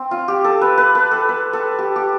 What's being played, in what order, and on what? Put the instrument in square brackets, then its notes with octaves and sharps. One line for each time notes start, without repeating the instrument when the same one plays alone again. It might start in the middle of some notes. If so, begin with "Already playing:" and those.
Already playing: [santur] C4
F4
G4
A4
B4
B4
B4
A4
B4
A4
G4
G4